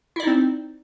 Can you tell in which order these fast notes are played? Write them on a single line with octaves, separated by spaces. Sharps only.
E4 D5 D#4 C4